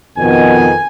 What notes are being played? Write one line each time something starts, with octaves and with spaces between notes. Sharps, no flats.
F2 B2 D#3 G#5